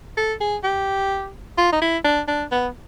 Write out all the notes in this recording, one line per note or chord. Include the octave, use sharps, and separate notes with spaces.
A4
G#4
G4
F4
D#4
E4
D4
D4
B3